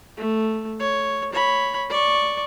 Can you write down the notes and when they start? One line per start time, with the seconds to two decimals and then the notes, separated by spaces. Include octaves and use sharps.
0.17 A3
0.80 C#5
1.33 C#5 B5
1.90 D5 C#6